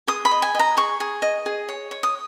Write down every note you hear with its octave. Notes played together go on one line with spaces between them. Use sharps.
G#4 D#6
B5
D#5
G#5
D#5 A#5
G#4 C#6
G#4
D#5
G#4
C#5
C#5
D#6